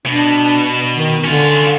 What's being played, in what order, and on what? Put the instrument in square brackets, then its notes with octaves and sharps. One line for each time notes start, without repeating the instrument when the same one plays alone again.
[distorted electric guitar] B2 [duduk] D4
[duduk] D#3
[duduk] D3 [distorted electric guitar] C#4 F4